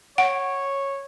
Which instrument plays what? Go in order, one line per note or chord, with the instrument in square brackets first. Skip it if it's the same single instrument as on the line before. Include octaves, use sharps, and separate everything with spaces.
[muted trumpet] C#5 [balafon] F#5